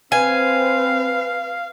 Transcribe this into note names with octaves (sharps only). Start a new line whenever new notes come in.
C4 B4 F5 G#5